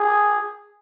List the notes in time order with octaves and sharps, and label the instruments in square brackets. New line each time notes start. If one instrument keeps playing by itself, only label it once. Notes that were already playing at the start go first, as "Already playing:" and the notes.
Already playing: [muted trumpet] G#4